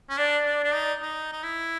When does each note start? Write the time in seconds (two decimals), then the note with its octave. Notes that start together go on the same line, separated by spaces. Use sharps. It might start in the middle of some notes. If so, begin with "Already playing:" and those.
0.10 C#4
0.18 D4 D5
0.46 D4
0.64 D4
0.74 D#4
1.02 D#4
1.33 D#4
1.43 E4